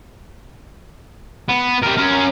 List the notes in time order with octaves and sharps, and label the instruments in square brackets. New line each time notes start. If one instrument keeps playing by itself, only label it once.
[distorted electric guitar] B3
G3 A#4
C#4 A#4